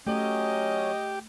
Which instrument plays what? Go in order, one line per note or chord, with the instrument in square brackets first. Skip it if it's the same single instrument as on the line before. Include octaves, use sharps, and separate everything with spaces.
[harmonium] F#3 C#4 [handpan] A3 [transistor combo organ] G4 [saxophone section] D#5